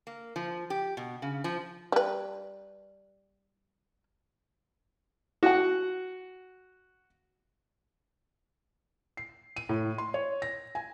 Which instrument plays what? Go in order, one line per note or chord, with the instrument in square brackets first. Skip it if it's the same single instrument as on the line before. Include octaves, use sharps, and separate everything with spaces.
[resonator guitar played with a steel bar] A#3
F3
G4
B2
C#3
F3
[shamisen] G3 B4
[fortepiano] F#4 F#5
[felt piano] C7
D#7
A2
C6
C#5
A#6
G#5